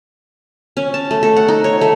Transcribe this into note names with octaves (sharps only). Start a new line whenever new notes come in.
C#4
A5
A3
A4
F#5
D#4
C#5
A3